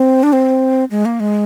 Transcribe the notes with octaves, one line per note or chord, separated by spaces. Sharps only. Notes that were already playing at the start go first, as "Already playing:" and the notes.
Already playing: C4
D4
C4
G#3
A#3
G#3